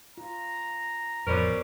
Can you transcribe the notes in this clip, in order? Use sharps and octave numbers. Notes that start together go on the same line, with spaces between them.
F4 A#5
A1 F2 B2 C#4 A#4 C5 D5